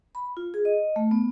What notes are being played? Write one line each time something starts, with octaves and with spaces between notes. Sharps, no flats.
B5
F4
G#4
D#5
A3
B3